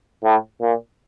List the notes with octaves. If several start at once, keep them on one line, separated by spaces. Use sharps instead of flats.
A2
A#2